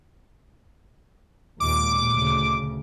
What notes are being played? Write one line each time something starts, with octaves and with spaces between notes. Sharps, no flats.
D#2 A#2 G#3 D6
D2 C#3